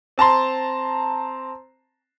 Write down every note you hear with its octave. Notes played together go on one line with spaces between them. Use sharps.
C4 A5 A#5 C6